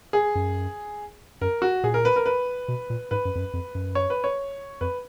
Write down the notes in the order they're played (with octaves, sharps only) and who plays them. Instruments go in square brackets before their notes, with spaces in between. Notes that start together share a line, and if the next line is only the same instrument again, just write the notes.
[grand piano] G#4
[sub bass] F#2
[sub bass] F#2 [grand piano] A#4
[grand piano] F#4
[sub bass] A#2 [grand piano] G#4
[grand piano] A#4
B4
A#4
B4
[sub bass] B2
A#2
[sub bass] G#2 [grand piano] B4
[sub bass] F#2
F2
F#2
F2
F#2
[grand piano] C#5
B4
C#5
[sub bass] F2 [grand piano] B4